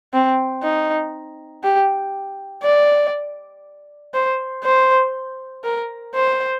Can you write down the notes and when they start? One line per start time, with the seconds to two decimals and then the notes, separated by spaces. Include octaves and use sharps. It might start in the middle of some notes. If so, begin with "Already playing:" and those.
0.13 C4
0.63 D#4
1.63 G4
2.64 D5
4.14 C5
4.64 C5
5.64 A#4
6.15 C5